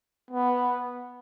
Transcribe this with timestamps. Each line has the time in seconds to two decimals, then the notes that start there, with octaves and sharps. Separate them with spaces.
0.31 B3